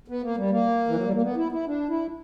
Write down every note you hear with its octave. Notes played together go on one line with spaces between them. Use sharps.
B3
A#3
G3
A#3
E3
F#3
G3
A#3
B3
E4
E4
D4
E4